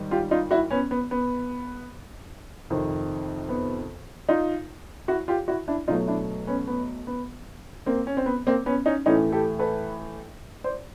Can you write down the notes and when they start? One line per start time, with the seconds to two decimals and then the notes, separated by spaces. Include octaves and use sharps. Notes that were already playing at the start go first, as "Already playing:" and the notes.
Already playing: G#2 D#3 G3
0.11 F4 G4
0.31 D#4 F4
0.51 E4 F#4
0.70 B3 C#4
0.91 B3
1.11 B3
2.70 F2 C3 D#3
3.49 B3
4.29 D#4 F4
5.08 E4 F#4
5.28 F4 G4
5.48 E4 F#4
5.68 D4 E4
5.88 B2 F#3 A3 D#4 F4
6.07 D4 E4
6.47 B3 C#4
6.67 B3
7.07 B3
7.86 A#3 C4
8.07 C#4
8.17 C4
8.26 B3
8.47 A#3 C4
8.66 B3 C#4
8.86 C#4 D#4
9.06 A2 E3 A3 C#4 D#4
9.32 G4 A4
9.59 A4 B4
10.64 C5 D5